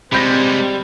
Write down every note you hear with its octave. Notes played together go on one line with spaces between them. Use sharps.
C3 G3 G#3 C4 G4 B5 G6 A#6